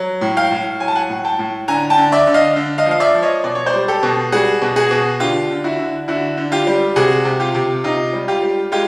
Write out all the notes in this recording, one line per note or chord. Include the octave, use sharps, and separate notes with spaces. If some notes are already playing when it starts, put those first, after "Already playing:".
Already playing: F#3
A2
F5 G5
A2
F#3 G#5
A5
F#5 G#5
A2
G5 A5
A2
D3 G#5 A#5
G5 A5
D3
D5 E5
D3
D#5 F5
D3
D#5 F5
F3
F5
D5 E5
F3
C#5 D#5
B2 D5
C#5
C5 D5
G3
G4 A4
B2
G3 F#4 G#4
B2
F#4 G#4
B2
D3 F4 G4
D3
E4 F#4
D3
D3 E4 F#4
D3
F4 G4
G3
C3 F#4 G#4
C3
F4 G4
C3
C3 D#4 F4
G3
F4 G4
G3
G#3 F4 G4